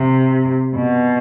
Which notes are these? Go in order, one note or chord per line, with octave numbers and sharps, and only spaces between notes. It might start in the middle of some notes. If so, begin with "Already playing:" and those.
Already playing: C3
B2